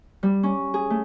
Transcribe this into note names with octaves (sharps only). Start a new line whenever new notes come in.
G3
C#4
G#4
A3